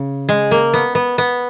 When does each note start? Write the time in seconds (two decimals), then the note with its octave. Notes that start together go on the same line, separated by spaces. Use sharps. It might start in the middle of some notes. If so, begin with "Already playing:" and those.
Already playing: C#3
0.29 G#3
0.51 A#3
0.74 B3
0.95 B3
1.18 B3